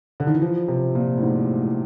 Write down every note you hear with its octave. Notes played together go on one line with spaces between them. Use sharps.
D3
D#3
E3
F3
C3
A#2
A2
G#2
A2